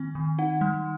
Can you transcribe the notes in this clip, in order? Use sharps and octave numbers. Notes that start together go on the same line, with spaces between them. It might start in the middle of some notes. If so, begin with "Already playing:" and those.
Already playing: D#3 C4
D#3
D#4 F#5
G3